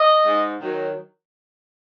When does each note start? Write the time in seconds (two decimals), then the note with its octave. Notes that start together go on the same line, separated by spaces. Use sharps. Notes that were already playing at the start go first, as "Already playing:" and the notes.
Already playing: D#5
0.24 G#2
0.62 D#3 F#3